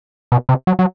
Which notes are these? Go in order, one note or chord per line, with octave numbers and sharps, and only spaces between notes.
B2
C3
F#3
F#3